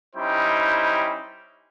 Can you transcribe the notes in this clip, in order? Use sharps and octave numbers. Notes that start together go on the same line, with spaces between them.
G3 C#4 D#4 E4 C5 G5